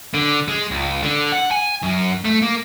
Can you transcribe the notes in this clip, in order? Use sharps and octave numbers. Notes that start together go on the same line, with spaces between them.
D3
G#3
C#2
D3
F#5
G#5
F#2
A3
A#3